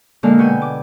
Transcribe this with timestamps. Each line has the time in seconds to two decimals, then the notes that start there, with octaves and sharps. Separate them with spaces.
0.23 A#2 D3 G#3 A#3 A4 F5
0.38 B2 F#4 G5 G#5
0.61 D6